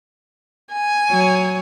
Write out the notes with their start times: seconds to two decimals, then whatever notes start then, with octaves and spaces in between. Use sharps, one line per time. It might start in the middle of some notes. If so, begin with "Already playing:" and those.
0.71 G#5
1.11 F#3 C#5